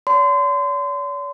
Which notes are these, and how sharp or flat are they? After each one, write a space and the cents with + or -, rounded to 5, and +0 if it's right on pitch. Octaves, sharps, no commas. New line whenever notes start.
C#5 +45 C6 -30